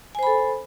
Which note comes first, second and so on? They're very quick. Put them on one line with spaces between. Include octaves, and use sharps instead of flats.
G#5 C5 B5 A4